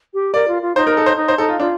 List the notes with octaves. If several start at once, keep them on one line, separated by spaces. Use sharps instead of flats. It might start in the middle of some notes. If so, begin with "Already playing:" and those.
G4
A#4 D5
F4
F4
D#4 C5
A#4
A4
C5
D#4
C5
D#4 A4
F4
D4 F4